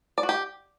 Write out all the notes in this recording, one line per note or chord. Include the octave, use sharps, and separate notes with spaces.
D5
F#4
G4